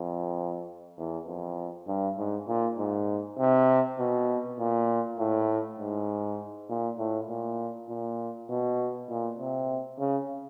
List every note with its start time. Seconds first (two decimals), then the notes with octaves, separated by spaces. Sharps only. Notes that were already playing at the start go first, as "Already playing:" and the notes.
Already playing: F2
0.98 E2
1.28 F2
1.88 G2
2.18 G#2
2.48 A#2
2.78 G#2
3.39 C3
3.99 B2
4.59 A#2
5.19 A2
5.80 G#2
6.69 A#2
6.99 A2
7.29 A#2
7.89 A#2
8.49 B2
9.10 A#2
9.39 C3
9.99 C#3